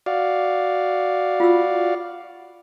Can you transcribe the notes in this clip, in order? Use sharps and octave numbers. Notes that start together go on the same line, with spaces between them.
F#4 D5 F5
F4 E6